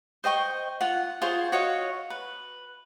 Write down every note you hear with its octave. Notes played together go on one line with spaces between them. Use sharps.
C5 D#5 G5 C#6
F4 F#5
F4 G#4 C5 C#5
F#4 C#5 D#5 F5
B4